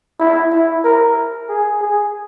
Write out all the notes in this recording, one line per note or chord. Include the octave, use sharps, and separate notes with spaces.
E4
E4
A#4
G#4
G#4